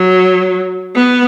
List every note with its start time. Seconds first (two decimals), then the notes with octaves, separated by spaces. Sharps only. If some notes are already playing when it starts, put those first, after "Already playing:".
Already playing: F#3
0.95 B3